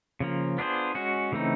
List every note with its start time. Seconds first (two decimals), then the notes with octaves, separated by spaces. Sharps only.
0.20 C#3 F3 A#3
0.58 B3 D4 F4 G#4 C5
0.95 G#3 C#4 F#4
1.32 C#3 E3 A3 C4 D#4